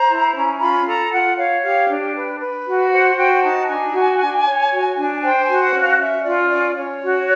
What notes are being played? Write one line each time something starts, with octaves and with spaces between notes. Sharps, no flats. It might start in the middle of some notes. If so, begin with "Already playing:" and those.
Already playing: C5 A#5
E4
C#4
F4 B5
A4 A#5
F4 F#5
C#5 F5
G4 F5
D4
B4
B4
F#4
C5 F#5
F#4 G5
D#4 A5
D4 G#5
F#4
D4
C#5
F#4
D4
C5 G5
G#5
F#4
F#5
C#4
F5
C#4 E5
F4 D5
C#4 D5
C#4 C#5
F#4